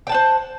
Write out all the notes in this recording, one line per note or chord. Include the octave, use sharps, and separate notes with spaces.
C5 F#5 G5 A5